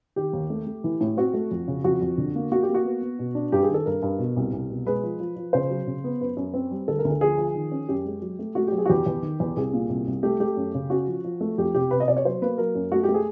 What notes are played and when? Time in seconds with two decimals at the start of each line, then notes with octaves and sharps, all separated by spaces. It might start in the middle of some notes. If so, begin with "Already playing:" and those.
0.16 D#3 G4
0.33 D#2
0.50 A3
0.67 A3
0.84 E3
1.01 A2
1.17 C4 F#4
1.34 A3
1.51 F2
1.68 C#3
1.84 F2 F#4
2.01 F2
2.18 D3
2.35 A#3
2.52 A#3 F#4
2.63 G4
2.69 A#3
2.74 F#4
2.85 B3
3.01 B3
3.19 B2
3.35 D4
3.52 G2 G4
3.63 G#4
3.70 D#3 A4
3.86 G2 A#4
4.02 G2
4.19 B2
4.36 C2
4.53 C2
4.70 B2
4.86 G#3 B4
5.03 F3
5.20 F3
5.36 F3
5.53 C#3 C5
5.70 F#3
5.87 C#3
6.04 B3
6.21 F#2 B4
6.37 F#2
6.54 C4
6.71 G3
6.88 D2 A4
6.99 A#4
7.05 D2
7.10 A4
7.21 F3 G#4
7.38 F3
7.55 D#3
7.71 C#4
7.89 F#2 G4
8.05 G#3
8.22 F#3
8.39 A3
8.55 A3 F#4
8.67 F#3 G4
8.78 G#4
8.86 F#4
8.89 E2 G4
9.06 E2
9.22 D#3
9.40 E2
9.56 C2 G#4
9.73 A#2
9.89 C2
10.07 C2
10.23 A3 G4
10.40 A3 G4
10.57 F#2
10.74 C#3
10.90 C#4 F#4
11.07 F3
11.24 F3
11.41 A3
11.58 F2 G4
11.74 C3 G4
11.91 C3 B4
12.00 D#5
12.08 C3 D5
12.17 C#5
12.25 F#3 C5
12.42 A#3 B4
12.58 F#3 A#4
12.75 F#2
12.91 A3 F#4
13.03 G4
13.08 A3
13.14 G#4